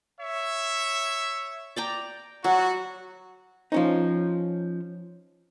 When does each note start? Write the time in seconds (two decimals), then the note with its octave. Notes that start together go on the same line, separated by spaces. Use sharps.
0.21 C#5 E5
1.76 D5 G5 A#5
2.44 F#3 G3 F#4
3.72 F3 C#4 D#4